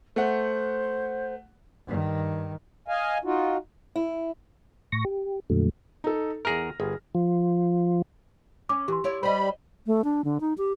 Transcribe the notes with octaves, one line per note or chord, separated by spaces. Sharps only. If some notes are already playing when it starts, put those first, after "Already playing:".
A3 C5 F#5
G2 D#3
D#5 F5 G#5
D#4 F4 F#4
E4
A2 C#6 A#6
G4
F2 A#2 D3 F#3 A3
D#4 A4
E2 G#4 A#4 F6 A#6
G1 G#4
F3
C#4 D6
E3 G4 C6
E4 C#5 D5
G3 C5 D#5 B5
A3
D4
D3
D#4
G4